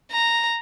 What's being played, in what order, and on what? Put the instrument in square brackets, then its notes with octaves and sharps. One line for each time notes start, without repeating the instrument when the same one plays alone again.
[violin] A#5